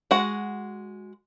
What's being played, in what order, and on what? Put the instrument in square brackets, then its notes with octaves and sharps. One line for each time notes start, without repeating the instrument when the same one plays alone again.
[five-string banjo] G#3 F#4 F#5